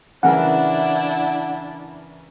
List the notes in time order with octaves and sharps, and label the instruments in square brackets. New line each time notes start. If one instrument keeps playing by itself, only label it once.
[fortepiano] C#3 E3 A#4 [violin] D4 E4 [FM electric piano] F#5